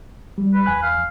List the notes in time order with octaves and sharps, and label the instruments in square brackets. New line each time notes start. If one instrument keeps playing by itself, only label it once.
[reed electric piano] G3
[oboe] B4
[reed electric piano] E2 G#5 F#6
[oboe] F5